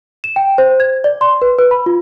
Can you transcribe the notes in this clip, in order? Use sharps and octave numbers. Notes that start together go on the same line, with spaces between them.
E7
G5
C5
G#6
D5
C6
B4
B4
B5
F4